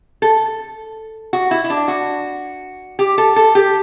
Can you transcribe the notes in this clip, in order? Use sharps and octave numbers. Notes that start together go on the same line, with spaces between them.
A4
F#4
E4
E4
D4
F#4
G4
A4
A4
G4